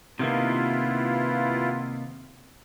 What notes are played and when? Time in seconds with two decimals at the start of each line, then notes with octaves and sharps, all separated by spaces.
0.19 C3 D#3 A#3 B3 E4 F4